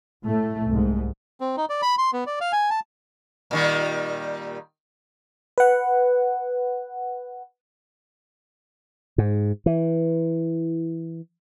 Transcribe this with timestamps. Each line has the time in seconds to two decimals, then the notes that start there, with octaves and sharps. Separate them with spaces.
0.24 A2 A3
0.67 C2 G#2
1.40 C4
1.57 D#4
1.69 D5
1.82 B5
1.98 C6
2.13 B3
2.27 D5
2.41 F5
2.52 G#5
2.70 A5
3.51 A#2 D#3 G3
5.58 B4 F#5
9.18 G#2
9.66 E3